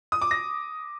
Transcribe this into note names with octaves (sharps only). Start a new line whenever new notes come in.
D#6
D6
A#6